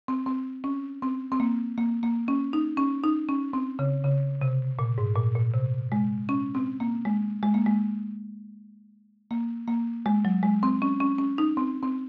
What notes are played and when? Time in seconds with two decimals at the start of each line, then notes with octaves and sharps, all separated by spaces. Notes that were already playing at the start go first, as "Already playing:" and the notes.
0.08 C4
0.26 C4
0.64 C#4
1.02 C4
1.32 C4
1.40 A#3
1.78 A#3
2.03 A#3
2.28 C#4
2.53 D#4
2.77 C#4
3.04 D#4
3.29 C#4
3.53 C4
3.79 C#3
4.04 C#3
4.42 C3
4.79 A#2
4.98 G#2
5.16 A#2
5.35 A#2
5.54 C3
5.92 G#3
6.29 C#4
6.55 C4
6.80 A#3
7.05 G#3
7.43 G#3
7.54 A#3
7.67 G#3
9.31 A#3
9.68 A#3
10.06 G#3
10.25 F#3
10.43 G#3
10.63 C4
10.82 C#4
11.00 C#4
11.19 C#4
11.38 D#4
11.57 C4
11.83 C4